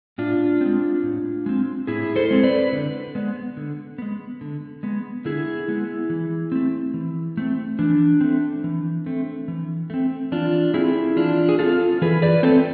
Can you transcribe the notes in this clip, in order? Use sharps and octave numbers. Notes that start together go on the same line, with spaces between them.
A2 D4 F4
G#3 C4
A2
G#3 C4
A2 E4 G#4
A4 C5
G#3 C4
B4 D5
D3
G#3 B3
D3
G#3 B3
D3
G#3 B3
D3 E4 G#4
G#3 B3
E3
A3 C4
E3
A3 C4
E3 D4
A3 C4
E3
A3 C4
E3
A3 C4
E3 D4 F4
A3 C4 E4 G#4
E3 D4 F4
G#4
A3 C4 F4 A4
E3 G#4 B4
B4 D5
A3 C4 A4 C5